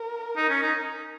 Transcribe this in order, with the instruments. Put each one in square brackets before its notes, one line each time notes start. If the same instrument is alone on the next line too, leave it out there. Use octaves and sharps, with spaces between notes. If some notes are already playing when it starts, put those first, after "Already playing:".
Already playing: [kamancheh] A#4
[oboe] D#4
C#4
D#4